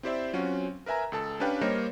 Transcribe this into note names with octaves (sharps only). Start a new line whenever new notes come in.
C4 E4 G4 C5 D5 E5
F#3 C4 C#4 F4 F#4
A#4 B4 E5 G#5 A#5
C#2 A4 A5
C#4 D4 G4 B4 F5 G5
G3 A#3 A#4 C5 C#5 D#5